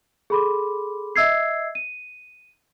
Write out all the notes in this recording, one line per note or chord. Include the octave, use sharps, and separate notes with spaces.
G#4 A4 B5 C6 D6
D#5 E5 E6 G#6 C7
D#7